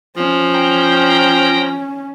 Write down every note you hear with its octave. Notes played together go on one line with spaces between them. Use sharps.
F3 C#4
G5 A#5